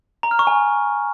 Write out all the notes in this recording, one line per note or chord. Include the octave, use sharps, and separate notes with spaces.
A#5
F6
C#6
G#5